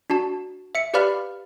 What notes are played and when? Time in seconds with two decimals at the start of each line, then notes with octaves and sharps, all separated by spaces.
0.10 D4 F#4 A5
0.75 E5 C#7
0.94 G4 B4 D5 F5 B5 F6